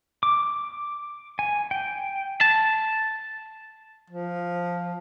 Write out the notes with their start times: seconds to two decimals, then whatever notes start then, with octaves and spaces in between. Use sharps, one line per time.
0.23 D6
1.39 G#5
1.71 G5
2.41 A5
4.10 F3